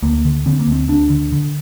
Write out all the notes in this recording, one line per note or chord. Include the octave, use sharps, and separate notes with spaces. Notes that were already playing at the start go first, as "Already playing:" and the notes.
D2 A#3
D3
D3 C4
A#3
D2 C4
D2 D4
D3
D3